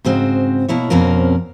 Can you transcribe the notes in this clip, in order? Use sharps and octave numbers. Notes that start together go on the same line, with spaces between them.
G#2 C#3 C4 F#4
B2 A#3 E4 C#5
F2 B2 C4 C#4 A#4